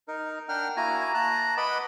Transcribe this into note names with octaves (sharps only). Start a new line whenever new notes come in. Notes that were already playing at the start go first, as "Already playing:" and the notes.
D#4 A#4
D4 A#4 F#5 G5 F6
A#3 E4 F#4 G#5 A#5
A5 A#5 F#6
B4 D#5 F#5 B5 D6